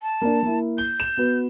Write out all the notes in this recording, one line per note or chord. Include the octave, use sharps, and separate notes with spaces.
A5
A#3 D4
A#3 E4
G6 G7
E7
B3 F#4 B4